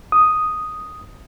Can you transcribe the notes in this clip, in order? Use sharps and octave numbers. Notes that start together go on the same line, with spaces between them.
D#6